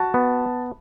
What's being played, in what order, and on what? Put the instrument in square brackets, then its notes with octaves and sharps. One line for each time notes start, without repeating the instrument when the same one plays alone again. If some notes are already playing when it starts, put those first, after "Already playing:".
Already playing: [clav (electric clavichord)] F#4 [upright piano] A5
[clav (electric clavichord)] B3